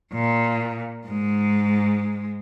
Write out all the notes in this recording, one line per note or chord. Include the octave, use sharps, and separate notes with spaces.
A#2
G#2 G#3